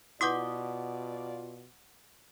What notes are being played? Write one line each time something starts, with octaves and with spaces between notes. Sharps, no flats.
B2 E4 F4 B4 D5 F#5 D6 D#6